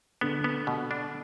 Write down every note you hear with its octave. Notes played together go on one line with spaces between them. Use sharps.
D3 B3
B3
B2
D4